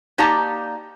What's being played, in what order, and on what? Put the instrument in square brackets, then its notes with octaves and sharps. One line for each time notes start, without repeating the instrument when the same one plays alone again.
[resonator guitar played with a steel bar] A#3 D#4 G4 D5 A5 A#5